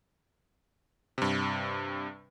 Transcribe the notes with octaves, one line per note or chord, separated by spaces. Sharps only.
G2 C3